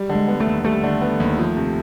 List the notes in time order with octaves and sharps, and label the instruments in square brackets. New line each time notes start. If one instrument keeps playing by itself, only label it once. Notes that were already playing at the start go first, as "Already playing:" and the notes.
Already playing: [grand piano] G3
D3
[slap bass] G#3
[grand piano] B3
[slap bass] A3
[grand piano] D#2
[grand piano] G3 [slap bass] A3
[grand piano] D3
B3
D#2
F3
C3